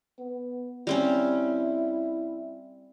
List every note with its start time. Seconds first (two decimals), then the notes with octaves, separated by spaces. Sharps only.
0.19 B3
0.87 G3 C4 C#4 E4